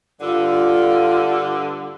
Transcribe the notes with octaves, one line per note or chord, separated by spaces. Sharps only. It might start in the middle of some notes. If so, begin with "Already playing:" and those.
G2 D3 F4